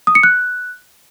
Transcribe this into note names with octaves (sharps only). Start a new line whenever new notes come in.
D#6
C#7
F#6